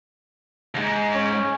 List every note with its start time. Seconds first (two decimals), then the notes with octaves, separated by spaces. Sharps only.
0.75 D2 G#2
1.14 C#4